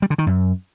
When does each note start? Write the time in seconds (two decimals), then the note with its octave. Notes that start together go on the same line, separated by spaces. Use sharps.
0.02 G3
0.10 D3
0.18 D#3
0.26 F#2